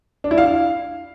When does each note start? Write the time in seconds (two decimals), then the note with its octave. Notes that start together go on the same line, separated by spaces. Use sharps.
0.24 D4
0.31 E4
0.38 F5